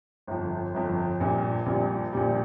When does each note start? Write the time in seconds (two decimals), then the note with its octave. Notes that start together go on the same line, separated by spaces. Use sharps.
0.27 G1 F2 F3
0.74 G1 F2 F3
1.20 A#1 A#2 G3
1.66 A#1 A#2 G3
2.13 A#1 A#2 G3